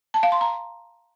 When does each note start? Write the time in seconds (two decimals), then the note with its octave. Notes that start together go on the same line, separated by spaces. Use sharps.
0.14 A5
0.23 F5
0.32 C6
0.41 A#5